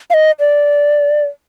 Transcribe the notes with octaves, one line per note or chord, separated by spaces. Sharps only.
F5
D#5
D5